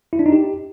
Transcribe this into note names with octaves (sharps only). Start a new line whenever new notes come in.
E4
D4
D#4
G4